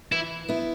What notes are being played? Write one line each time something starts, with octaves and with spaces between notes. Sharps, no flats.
E3 E4
B3 E4